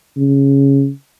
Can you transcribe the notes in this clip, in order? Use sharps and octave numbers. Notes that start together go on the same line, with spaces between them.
C#3